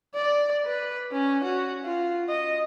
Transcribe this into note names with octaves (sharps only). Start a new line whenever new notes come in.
D5
B4
C#4
F#4
F4
D#5